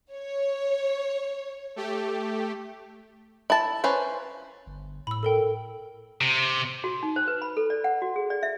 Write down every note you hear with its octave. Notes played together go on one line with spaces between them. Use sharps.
C#5
A3 G4
E4 A5
C#4 B4 C5
G1
A2 B5 E6
A4 A#4 G5
C3
F#4
D#4
C5
B4
B5
A4
D5
F#5
F#4
G#4
D5
E5